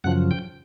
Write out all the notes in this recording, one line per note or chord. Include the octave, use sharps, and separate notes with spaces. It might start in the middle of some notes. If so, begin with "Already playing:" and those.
F#2 C#3 F3 F#5
G5